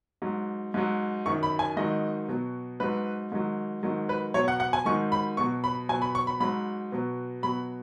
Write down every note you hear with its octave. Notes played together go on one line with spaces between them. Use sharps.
G#2 F#3
G#2 F#3
F#2 D#3 F#3 C#6
B5
G#5
G#2 D#3 F#3 D#5
B2 F#3
G#2 F#3 B4
G#2 D#3 F#3
G#2 D#3 F#3
B4
B2 F#3 C#5
F#5
F#5
G#5
G#2 D#3 F#3 C#6
B5
B2 F#3 C#6
B5
B2 F#3 G#5
B5
C#6
B5
G#2 F#3 B5
B2 F#3
B2 F#3 B5